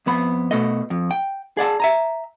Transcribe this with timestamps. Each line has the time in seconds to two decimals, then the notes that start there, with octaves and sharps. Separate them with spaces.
0.06 F2 B3 B5
0.51 B2 A3 D#5
0.90 F2
1.11 G5
1.57 G#4 D5 F#5 A5
1.80 E5 G#5 A#5